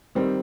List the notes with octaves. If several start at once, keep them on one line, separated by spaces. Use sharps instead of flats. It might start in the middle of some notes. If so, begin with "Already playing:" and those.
D#3 G3 C4